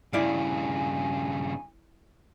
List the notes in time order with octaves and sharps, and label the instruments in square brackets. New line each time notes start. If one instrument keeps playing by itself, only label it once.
[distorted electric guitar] G2 C#3 [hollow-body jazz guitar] E4 D5 F5 [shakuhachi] G#5